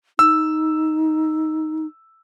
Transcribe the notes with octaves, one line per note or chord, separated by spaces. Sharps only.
D#4 E6